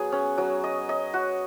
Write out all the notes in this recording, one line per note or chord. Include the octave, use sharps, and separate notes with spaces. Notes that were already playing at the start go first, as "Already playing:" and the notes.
Already playing: F#3 B3 G#4
C#4
F#3
D#5
D#5
F#4